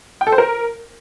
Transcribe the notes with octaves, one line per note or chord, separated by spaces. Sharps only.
G5
A4
C5
A#4